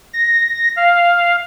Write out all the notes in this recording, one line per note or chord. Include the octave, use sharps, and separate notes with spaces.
A#6
F5